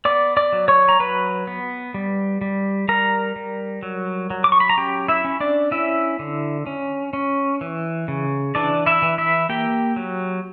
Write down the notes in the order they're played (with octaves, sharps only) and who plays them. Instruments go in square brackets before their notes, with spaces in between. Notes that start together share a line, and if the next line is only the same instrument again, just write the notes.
[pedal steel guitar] B3 D5 D6
D5 D6
F#3
C#5 C#6
A#5
F#3 B4 B5
B3
G3
G3
G3 A#4 A#5
G3
F#3
F#3
D6
C#6
B5
A#5
C#4 G4 G5
E4 E5
C#4
D4 D5
C#4 E4 E5
D3
C#4
C#4
E3
C#3
E3 D4 D5
E4 E5
E3
E4 E5
A#3 G4 G5
F#3